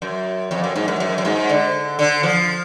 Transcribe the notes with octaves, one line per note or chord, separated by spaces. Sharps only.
F#2
F2
F#2
G#2
F#2
F#2
F#2
G#2
D3
D3
F3